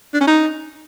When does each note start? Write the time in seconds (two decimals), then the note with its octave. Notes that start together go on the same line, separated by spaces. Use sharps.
0.14 D4
0.21 C#4
0.28 D#4